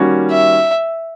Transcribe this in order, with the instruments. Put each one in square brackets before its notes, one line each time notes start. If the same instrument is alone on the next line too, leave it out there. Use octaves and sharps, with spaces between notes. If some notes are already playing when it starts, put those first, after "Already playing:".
Already playing: [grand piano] D#3 G3 A#3 C#4 F#4
[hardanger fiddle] E5